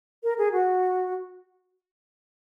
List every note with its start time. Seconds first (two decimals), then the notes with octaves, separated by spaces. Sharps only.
0.23 A#4
0.38 G#4
0.52 F#4